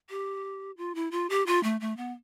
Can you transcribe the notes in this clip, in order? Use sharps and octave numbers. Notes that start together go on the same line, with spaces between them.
G4
F4
E4
F4
G4
F4
A3
A3
B3